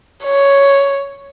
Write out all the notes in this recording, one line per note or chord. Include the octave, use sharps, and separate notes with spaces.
C#5